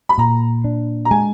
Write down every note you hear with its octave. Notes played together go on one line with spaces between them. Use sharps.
B5
A#2 A#5
D4
A#5
G#3 G#5